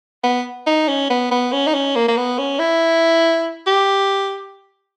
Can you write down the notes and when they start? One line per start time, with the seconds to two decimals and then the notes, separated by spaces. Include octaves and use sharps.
0.24 B3
0.67 D#4
0.88 C#4
1.10 B3
1.31 B3
1.53 C#4
1.67 D#4
1.74 C#4
1.96 A#3
2.08 A#3
2.17 B3
2.38 C#4
2.59 E4
3.67 G4